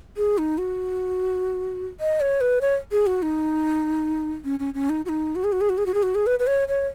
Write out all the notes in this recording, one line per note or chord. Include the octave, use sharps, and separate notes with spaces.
G#4
D#4
F#4
D#5
C#5
B4
C#5
G#4
F#4
D#4
C#4
C#4
C#4
D#4
F#4
D#4
F#4
G#4
F#4
G#4
F#4
G#4
F#4
G#4
F#4
G#4
B4
B4
C#5
C#5